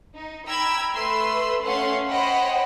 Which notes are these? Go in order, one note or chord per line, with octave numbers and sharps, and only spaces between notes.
D#4
G5 A#5 B5 E6 G#6
A3 B4 C6 E6
A3 C#4 F5 F#5 C6
C5 C#5 D#5 F#5 G5 B5